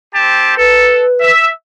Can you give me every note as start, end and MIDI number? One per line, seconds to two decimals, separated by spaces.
0.15 0.56 60
0.15 0.56 67
0.15 0.56 81
0.57 1.02 69
0.57 1.31 71
1.21 1.47 76